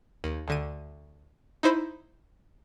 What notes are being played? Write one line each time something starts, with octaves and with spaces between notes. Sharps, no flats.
D#2
D2 D3 D#7
D#4 E4 C5 B5